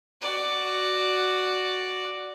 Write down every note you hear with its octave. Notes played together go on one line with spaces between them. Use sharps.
F#4 D5